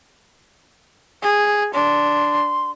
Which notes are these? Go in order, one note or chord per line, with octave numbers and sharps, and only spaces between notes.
G#4
D4 C6